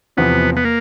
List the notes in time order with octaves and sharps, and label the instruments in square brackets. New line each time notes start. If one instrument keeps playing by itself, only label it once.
[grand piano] E2 C3 F3 [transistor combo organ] B3
[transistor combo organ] B3
A#3